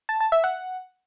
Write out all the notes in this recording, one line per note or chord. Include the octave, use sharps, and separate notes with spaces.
A5
A5
E5
F#5